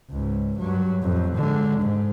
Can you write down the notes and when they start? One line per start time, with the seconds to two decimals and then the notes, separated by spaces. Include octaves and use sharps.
0.10 C#2 G#2
0.59 G2 F#3
1.03 F2 A2
1.35 D3 G#3
1.80 G#2